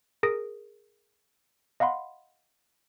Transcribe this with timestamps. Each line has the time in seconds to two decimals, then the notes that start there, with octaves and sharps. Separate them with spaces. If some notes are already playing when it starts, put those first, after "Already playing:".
0.23 G#4 A#4 D#6 A#6 D7
1.80 D#5 F5 F#5 B5 C6